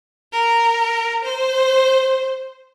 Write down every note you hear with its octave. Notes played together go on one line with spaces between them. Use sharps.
A#4
C5